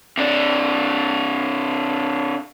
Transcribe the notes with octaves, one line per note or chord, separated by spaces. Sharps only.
C3 D4